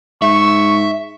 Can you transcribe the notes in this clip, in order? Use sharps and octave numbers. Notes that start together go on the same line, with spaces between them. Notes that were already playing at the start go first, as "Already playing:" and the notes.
G#2 E5 C#6